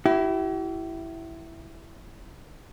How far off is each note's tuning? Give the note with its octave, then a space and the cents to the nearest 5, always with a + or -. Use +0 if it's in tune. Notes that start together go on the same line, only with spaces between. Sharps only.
E4 +5 G4 -45